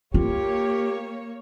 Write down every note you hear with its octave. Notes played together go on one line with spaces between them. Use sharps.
A#3 F4 G4 C#5